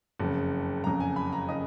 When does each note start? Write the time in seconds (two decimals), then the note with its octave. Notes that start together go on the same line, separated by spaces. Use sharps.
0.20 F#1 F2 C#3
0.84 F#1 F2 C#3 A#5
1.00 G#5
1.16 B5
1.33 A#5
1.49 C#3 D#5